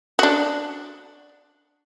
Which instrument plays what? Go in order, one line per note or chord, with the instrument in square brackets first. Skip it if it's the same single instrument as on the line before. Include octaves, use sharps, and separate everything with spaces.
[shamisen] D4 F#4